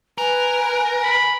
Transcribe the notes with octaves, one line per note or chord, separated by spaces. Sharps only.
A#4 B4 G#5
B5